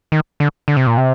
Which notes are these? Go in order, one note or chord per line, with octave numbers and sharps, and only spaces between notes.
D#3
D3
D3
C3
A#2
C3